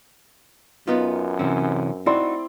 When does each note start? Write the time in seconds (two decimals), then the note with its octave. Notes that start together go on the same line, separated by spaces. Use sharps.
0.87 F#2 B3 D#4 F4
1.39 C3 E3 C4 C#4
2.06 C4 D#4 E4 F#4 D5 C6